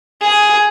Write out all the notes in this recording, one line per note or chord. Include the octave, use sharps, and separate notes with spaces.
G#4